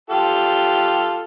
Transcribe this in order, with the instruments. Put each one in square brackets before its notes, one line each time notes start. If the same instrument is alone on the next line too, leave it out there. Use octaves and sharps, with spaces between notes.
[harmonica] F4 G4 A4